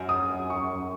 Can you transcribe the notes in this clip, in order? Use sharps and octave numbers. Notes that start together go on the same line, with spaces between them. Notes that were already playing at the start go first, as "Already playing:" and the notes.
Already playing: F#2
D#6
C#6